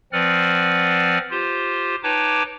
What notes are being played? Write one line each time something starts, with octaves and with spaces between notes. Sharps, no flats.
F3 C4 B4 D5 F#5 F6
F4 G4 C5
D#4 B4 C#5 G5 A5 D6